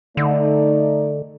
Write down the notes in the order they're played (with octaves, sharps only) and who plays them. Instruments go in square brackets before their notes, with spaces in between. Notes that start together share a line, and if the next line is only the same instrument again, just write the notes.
[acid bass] D3 [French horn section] A3 D#4 D5